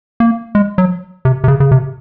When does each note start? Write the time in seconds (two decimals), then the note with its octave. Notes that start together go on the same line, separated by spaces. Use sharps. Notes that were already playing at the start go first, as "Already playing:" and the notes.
0.20 A#3
0.55 G#3
0.78 F#3
1.25 C3
1.44 C3
1.48 C#3
1.60 C#3
1.71 C3